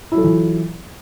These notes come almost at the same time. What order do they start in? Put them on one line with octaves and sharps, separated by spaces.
E4 F#3 A4 F4 E3